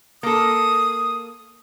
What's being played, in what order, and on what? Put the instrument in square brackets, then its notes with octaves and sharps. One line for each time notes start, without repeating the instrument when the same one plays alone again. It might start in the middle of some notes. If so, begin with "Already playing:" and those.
[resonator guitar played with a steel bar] A#3 A4 [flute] D#6